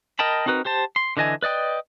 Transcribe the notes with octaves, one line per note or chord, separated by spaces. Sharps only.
A#4 D#5 G5 A5 B5
C4 D#4 F#4 A#4 B4
G4 C5 A5
C6
D3 E3 D#5 G#5
B4 D5 D#5 G5